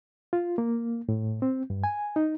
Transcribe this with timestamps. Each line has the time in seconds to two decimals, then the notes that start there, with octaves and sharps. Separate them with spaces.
0.33 F4
0.58 A#3
1.09 A2
1.42 C4
1.70 G2
1.84 G#5
2.16 D#4